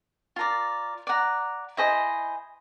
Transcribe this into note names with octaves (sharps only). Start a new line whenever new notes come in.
F4 A#4 D5
D5 F#5 A#5
E4 G#4 C5 D#5